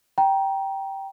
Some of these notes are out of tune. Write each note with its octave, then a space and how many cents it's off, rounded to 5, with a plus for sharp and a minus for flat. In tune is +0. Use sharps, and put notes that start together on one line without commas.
G5 -5 A#5 +20